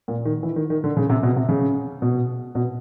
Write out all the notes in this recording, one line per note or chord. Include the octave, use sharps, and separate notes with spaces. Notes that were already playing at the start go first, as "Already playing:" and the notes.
A#2
D#3
E3
D#3
D#3
D3
C#3
C3
B2
C3
C#3
B2
B2